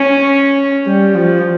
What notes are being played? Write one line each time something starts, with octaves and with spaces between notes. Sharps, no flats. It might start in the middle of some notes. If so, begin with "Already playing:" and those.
Already playing: C#4
G3
F3